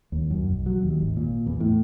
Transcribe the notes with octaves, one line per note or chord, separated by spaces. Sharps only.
D#2
F#2
B1
F#3
D#2
G#1
A#2
E2
A2